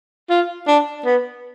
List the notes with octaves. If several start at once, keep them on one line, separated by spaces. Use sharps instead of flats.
F4
D4
B3